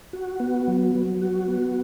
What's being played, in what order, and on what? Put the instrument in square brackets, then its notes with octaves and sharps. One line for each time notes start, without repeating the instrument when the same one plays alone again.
[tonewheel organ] F#4
B3
F#3
F#3
F#4
B3